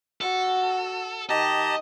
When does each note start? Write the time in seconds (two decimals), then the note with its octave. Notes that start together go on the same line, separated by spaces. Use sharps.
0.21 F#4 A4
1.29 D#3 G4 D#5 A5 A#5